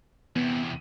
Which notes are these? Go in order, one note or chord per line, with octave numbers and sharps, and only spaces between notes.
E2 C3 B3